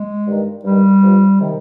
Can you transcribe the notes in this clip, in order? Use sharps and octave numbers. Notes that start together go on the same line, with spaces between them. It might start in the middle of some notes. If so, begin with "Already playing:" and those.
Already playing: G#3
G2 D#3
G2 D#3 G3
G2 F3
C3 D#3